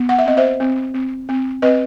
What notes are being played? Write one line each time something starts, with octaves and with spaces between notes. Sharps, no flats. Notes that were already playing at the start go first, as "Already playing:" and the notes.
Already playing: B3
F#5
E5
C4 D#5
C5 E5
C4
C4
C4
C4 B4 D#5